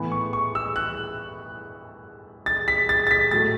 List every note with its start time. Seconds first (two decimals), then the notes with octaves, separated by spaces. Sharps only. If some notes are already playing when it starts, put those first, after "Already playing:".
Already playing: A2 E3 B3
0.12 C#6
0.33 C#6
0.55 E6
0.76 F#6
2.46 A6
2.68 B6
2.89 A6
3.07 A6
3.11 B6
3.31 A2 F#3 A3 A6